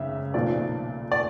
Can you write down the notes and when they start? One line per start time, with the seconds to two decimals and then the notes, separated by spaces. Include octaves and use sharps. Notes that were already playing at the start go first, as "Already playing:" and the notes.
Already playing: G#1 F#2 C#3 E5
0.34 B1 A#2 F3 D5
1.12 D5